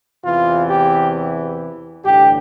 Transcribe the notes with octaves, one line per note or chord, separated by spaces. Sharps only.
E2 C3 E3 F4
G4
A1 G2 D3 G4